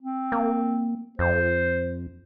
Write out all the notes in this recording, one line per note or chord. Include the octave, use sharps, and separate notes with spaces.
C4
A#3
F2 C5